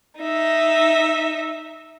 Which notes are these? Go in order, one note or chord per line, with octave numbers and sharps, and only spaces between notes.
D#4 E5